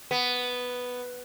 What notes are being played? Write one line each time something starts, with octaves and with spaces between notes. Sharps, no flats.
B3